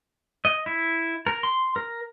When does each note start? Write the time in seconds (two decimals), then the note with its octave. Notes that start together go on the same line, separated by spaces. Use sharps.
0.45 D#5
0.66 E4
1.27 A#4
1.43 C6
1.76 A#4